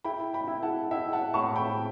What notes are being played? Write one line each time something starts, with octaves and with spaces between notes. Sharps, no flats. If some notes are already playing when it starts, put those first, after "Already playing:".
E4 G5 B5
G5 B5
E4
F#5 A5
E4 E5 G5
F#5 A5
A2 A5 C#6
G5 B5